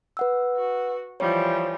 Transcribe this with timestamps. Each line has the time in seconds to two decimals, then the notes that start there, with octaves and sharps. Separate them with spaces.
0.17 B4 F#5 E6
0.55 F#4
1.20 E3 F3 G3 C#5